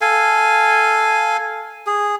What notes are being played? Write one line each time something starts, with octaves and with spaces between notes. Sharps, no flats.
A4 F5 G#5
G#4